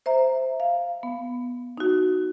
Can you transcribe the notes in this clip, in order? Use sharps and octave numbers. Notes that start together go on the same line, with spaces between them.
C5 E5 A#5
F5
B3
D#4 F#4